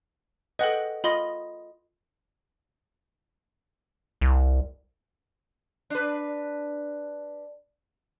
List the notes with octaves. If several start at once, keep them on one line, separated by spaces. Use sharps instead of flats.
A4 B4 D#5 F#5 G5
F4 D#5 B5 C6 A#6
C2
D4 B4